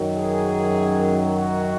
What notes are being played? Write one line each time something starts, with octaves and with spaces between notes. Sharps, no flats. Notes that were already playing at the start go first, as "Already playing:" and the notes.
Already playing: F#2 D#3 F#3
G#4
F#4